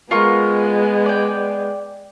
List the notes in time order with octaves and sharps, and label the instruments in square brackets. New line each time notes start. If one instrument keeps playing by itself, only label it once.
[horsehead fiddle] G#3 B3 [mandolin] F4 A#4 C#6
[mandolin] D5 G5